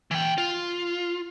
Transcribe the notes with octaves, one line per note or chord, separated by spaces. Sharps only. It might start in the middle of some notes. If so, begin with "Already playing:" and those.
E3 G5
F4